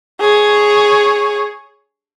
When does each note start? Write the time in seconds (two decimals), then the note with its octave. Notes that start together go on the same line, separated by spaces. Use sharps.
0.21 G#4 C#5